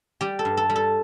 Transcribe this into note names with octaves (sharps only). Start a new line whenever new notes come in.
G3 G4
A4
G2
A4
G3
A4